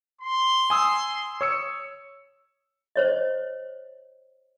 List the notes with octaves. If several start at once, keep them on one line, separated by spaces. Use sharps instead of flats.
C6
G#5 D#6 E6
C#5 E6 C#7
C5 C#5 D#5